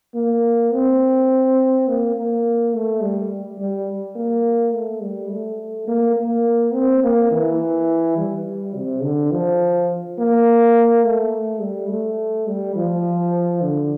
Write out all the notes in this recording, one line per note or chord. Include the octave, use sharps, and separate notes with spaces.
A#3
C4
A#3
A#3
A3
G3
G3
A#3
A3
G3
A3
A#3
A#3
C4
A#3
E3
G3
C3
D3
F3
A#3
A3
G3
A3
G3
F3
D3